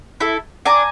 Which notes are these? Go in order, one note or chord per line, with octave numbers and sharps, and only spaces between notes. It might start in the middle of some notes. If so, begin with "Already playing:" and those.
E4 A4
D4 G#5 A#5